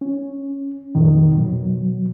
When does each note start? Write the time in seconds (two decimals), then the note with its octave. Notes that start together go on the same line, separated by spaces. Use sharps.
0.01 C#4
0.95 F2 A#2 D#3
1.33 B2 F#3